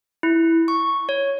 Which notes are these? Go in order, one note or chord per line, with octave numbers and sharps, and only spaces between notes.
E4
C#6
C#5